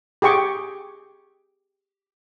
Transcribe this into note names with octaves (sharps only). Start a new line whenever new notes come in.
G4 G#4 G5 C#6 D6